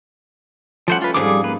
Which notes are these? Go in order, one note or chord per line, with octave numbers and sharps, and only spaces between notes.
F3 G3 A3 C#4 C5 F#5
F4 B4
F2 G#2 F3 G3 G#4 D6
A#3 B4